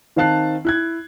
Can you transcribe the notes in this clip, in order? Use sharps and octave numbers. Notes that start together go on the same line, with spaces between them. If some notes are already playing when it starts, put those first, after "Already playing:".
D#3 C4 F5 A5 F#6 C7
E4 F#6 G#6